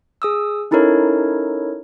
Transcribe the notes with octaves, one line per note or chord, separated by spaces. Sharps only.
G#4 D#6 E6
C#4 D#4 E4 A4 A#4 C#5